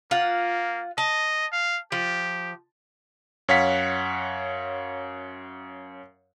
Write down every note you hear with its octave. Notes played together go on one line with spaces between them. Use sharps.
A#3 F4 F#5
D#5 A5
F5
F3 G4
F#2 C#5 F5 F#5 B6